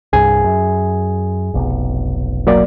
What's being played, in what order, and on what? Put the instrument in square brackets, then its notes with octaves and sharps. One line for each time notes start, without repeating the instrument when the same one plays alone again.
[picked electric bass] C2 G2 [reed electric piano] G#4 G#5
[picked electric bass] F#2
F1 B1
[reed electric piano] F#3 A#3 D5